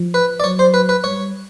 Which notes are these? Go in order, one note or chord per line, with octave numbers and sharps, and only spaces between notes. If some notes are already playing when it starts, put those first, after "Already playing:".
Already playing: F3
B4
D5
F#3 C#5
C5
B4
B4
G3 C#5